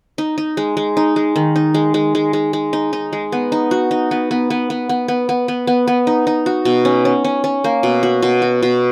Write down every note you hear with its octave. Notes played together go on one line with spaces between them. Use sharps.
D#4
D#4
G#3
G#3
D#4
G#3
D#3
D#4
G#3
G#3
G#3
G#3
G#3
D#4
D#4
G#3
B3
D#4
F#4
D#4
B3
B3
B3
B3
B3
B3
B3
B3
B3
B3
D#4
D#4
F#4
B2
C#4
C#4
C#4
C#4
A#3
B2
F#4
B2
F#4
B2